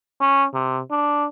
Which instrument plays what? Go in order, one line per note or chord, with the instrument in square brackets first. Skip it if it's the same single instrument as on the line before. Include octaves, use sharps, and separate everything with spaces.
[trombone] C#4
C3
D4